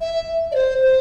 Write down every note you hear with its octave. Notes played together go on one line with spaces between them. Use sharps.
E5
D5
C5
C5